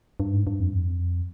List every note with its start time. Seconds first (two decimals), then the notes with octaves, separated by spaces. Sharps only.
0.20 G2
0.33 G#2
0.47 G2
0.60 F2
0.68 G2
0.73 F2